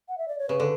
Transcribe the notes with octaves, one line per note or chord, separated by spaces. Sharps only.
F#5
E5
D5
C#5
C#3 B4
D3